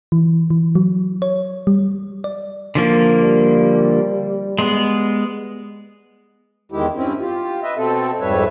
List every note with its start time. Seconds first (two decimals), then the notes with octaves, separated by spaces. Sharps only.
0.12 E3
0.50 E3
0.75 F#3
1.22 C#5
1.67 G3
2.24 D5
2.75 D3 F3 A#3
3.18 G3
4.59 G#3 B3
6.72 E2 D#3 G#3 E4 G4
6.95 G2 C4 C#4 E4
7.20 F4 G4
7.63 B4 D#5 E5
7.77 B2 C4 A4
8.20 F2 G#2 G3 B4 C#5 E5